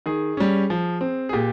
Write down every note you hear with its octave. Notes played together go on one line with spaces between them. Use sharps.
D#3 G#4
G3 C#4
F3
C4
G#4
A#2 G4